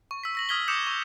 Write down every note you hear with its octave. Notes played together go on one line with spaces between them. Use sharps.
C#6
E6 B6
E6 A#6 F#7
D#6 F6 G#6 B6 G7
D6 D#6 G6 C#7 E7 F7
C#6